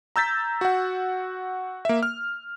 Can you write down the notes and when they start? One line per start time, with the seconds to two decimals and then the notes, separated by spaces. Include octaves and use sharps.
0.16 A#5 E6 G6 A6 B6
0.61 F#4 F#5
1.85 A#3 E5
2.03 F6